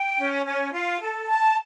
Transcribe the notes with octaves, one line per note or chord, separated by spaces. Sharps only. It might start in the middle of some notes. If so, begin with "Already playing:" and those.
Already playing: G5
C#4
C#4
F4
A4
A5